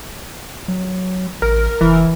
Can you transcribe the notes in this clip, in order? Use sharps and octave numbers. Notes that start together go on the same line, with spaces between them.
F#3
A1 A#4
F1 E3